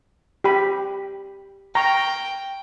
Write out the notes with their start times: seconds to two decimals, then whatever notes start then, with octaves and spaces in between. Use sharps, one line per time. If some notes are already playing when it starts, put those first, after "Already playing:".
0.44 G4 G5 B5
1.75 G5 A#5 C#6